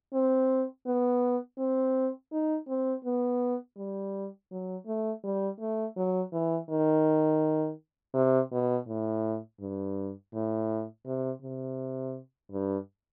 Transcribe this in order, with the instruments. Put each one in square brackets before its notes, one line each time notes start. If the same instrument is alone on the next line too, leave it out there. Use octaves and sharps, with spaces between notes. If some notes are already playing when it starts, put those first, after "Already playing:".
[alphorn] C4
B3
C4
D#4
C4
B3
G3
F#3
A3
G3
A3
F#3
E3
D#3
C3
B2
A2
G2
A2
C3
C3
G2